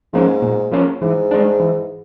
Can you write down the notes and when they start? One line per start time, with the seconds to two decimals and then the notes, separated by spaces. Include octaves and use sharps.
0.13 G#2 F3 A#3 C#4
0.42 A#2
0.71 F3 A#3 C#4
1.01 G#2 E3
1.31 G#3 B3 D4
1.60 E3